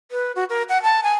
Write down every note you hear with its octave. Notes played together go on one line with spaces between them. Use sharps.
B4
F#4
A#4
F#5
A5
G#5